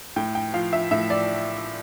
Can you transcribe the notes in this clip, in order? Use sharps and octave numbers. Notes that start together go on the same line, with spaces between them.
A2 G5
G5
F3 F5
E5
A2 E5
D5